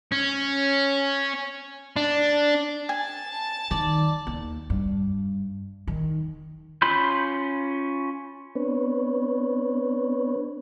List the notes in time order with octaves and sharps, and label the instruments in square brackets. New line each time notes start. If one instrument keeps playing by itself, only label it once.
[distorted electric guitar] C#4
D4
[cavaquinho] G#5 [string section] A5
[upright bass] D#3 [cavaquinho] D5
[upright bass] D#2
G2
D#3
[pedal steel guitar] C#4 F4 B5 C6 G6
[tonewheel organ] B3 C4 D4 B4 C#5